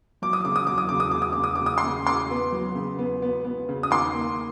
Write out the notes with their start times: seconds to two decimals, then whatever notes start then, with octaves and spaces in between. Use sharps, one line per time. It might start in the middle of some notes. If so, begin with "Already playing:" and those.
0.22 F#3 D6
0.33 D#6
0.45 C#3 D6
0.56 D#6
0.67 F#3 D6
0.78 D#6
0.89 C#3 D6
1.00 D#6
1.11 C#3 D6
1.22 D#6
1.33 C#3 D6
1.44 D#6
1.55 D6
1.61 C#3
1.66 D#6
1.77 C6 D6
1.84 C#3
2.07 C#3 C6 D6
2.30 B3
2.52 F#3
2.75 C#3
2.99 B3
3.22 B3
3.44 B3
3.69 C#3
3.83 D#6
3.91 D#3 C6 D6
4.14 A#3